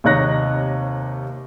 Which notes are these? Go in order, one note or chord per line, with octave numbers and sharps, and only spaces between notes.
D#2 C3 D#4 C#5 F#6 A#6